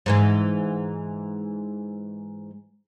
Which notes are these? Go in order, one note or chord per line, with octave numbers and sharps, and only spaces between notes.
G#2 E3 G#3